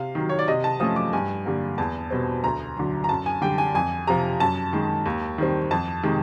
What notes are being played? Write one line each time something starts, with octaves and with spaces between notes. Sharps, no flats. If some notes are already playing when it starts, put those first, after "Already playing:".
Already playing: C3 F5
D#3 F#3
C#5
D5
C3 D#5
A5
F3 A3 C#4 D#6
D6
G2 G#5
D3 G3 A#3
E2 A5
B2 G3 C4
D2 A#5
D3 F#3
A#5
F#2 A5
G#5
D3 G3 G5
G#5
F2 G#5
C3 F3 A#5
F#2 A5
D#3 G#3
D#2
D#3 G3 C4
F2 A5
C3 D#3 G#3